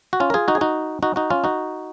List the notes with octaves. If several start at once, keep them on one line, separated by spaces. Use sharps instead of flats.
F#4
C#4 F4
A#4
F4 G#4
D#4 F#4
G#4
D#4 F#4
D#4 F#4
D#4 F#4
C#4 F4
D#4 F#4